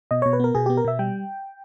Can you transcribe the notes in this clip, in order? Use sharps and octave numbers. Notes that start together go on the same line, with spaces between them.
B2 D#5
B2 C#5
B4
B3 A#4
B2 G#4
B3 G4
A#4
B2 E5
G3 G5